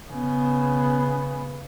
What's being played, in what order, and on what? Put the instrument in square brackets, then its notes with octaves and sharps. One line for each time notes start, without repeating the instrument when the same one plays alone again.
[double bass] C#3 B3